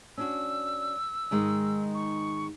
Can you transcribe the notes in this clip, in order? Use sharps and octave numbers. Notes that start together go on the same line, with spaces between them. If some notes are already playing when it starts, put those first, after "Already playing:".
C#4 D4 F#4 E6
G#2 D#3 G#3
C#6